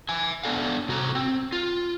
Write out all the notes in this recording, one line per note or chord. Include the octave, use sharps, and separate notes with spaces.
E5 G#5
B3 D4 A4 F5
C3 F#4 A5 A#5
C4
F4